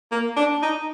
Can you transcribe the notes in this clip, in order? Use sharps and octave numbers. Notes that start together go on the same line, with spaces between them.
A#3
D4
D#4